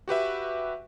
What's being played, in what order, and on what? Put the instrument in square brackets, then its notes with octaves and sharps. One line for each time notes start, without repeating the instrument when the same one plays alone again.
[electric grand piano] F#4 G4 B4 E5